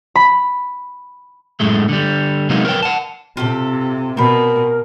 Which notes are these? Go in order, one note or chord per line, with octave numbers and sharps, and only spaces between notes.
B5
F#2 A2 G#3 A3
D3 G3
C3 F#3 G#3 A#3 B3 D#4
A#4 B4 C#5 G5
F#5 A5
C3 F4 G4 A4
B2 C4 A#4 B5